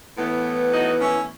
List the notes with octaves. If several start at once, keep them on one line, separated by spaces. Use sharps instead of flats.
A2 E3 B3
D#4 F#4
C#4 E4